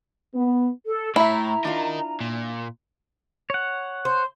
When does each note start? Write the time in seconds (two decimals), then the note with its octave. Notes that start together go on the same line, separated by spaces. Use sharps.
0.34 B3
0.86 A4
1.16 A2 E4 E5 A#5 B5
1.65 D4 D#4 F4 A#4
2.21 A#2
3.50 C#5 F#5
4.05 C5